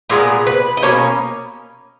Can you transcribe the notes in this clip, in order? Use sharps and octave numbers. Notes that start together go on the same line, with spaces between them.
A#2 G#3 B3 A#4
B4
D#5
B2 A#3 C#4 C#5